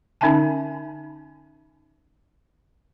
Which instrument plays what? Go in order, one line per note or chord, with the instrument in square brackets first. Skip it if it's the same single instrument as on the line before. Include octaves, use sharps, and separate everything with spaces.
[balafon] D3 C#4 D#4 E5 G#5 A5